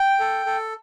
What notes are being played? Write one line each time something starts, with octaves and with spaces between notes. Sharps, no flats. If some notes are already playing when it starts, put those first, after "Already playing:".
Already playing: G5
A4
A4